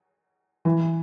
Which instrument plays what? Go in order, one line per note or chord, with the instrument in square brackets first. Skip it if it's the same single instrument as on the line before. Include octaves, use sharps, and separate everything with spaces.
[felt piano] E3